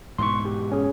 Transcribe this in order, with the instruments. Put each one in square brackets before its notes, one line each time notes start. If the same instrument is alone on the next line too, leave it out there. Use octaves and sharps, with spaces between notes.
[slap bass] G#2 B2 E3 [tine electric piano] C6 C#6
[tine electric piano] G4
C#4 G#4